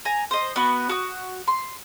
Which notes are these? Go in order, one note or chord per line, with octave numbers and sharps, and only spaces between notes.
G#5 A#5
C5 D#5
B3 F#4 B4
F#4 D#6
C6